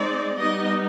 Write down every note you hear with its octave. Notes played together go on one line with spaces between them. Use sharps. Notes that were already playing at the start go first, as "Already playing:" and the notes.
Already playing: G#3 C4 D#4 D5
G3 B3 D#4 D#5